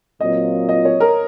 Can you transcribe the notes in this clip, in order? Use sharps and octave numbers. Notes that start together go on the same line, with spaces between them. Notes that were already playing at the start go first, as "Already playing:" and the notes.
A#2 F#3 C4 F4 D#5
D#5
C#5
A#4